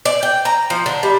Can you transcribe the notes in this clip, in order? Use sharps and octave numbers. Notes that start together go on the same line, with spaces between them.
D5
G5
A#5
F3
D3
G3